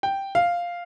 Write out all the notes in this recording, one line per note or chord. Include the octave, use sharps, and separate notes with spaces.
G5
F5